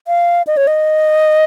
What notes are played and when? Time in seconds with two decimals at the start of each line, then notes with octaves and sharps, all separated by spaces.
0.08 F5
0.47 D#5
0.57 C#5
0.67 D#5